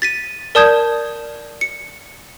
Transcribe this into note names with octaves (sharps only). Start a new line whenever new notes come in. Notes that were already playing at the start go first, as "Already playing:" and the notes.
A6 B6 D#7
A#4 D5 A5 D#6 G6 G#6
C#7